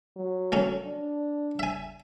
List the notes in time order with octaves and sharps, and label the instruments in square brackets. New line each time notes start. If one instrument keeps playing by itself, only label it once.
[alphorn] F#3
[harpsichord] D#3 A3 C#4
[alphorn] D4
[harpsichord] E5 G#5